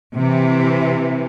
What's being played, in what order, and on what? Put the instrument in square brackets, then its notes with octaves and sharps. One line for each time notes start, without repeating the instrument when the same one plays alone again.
[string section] C3 E3